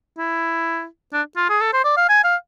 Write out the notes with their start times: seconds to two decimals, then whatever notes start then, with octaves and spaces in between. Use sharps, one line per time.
0.18 E4
1.13 D4
1.36 F4
1.49 G#4
1.61 A4
1.73 C5
1.84 D5
1.97 F5
2.09 G#5
2.24 F5